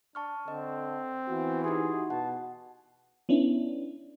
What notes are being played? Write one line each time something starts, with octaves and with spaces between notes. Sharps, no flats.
D4 A5 C#6 F6
D3 C4 D#5
E3 B3 F#4
D#4 G4 G#4 C6
B2 F#5 A5
B3 C#4 D4 E4